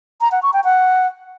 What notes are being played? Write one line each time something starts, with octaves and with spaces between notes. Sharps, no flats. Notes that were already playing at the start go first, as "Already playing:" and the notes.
A#5
F#5
C#6
G5
F#5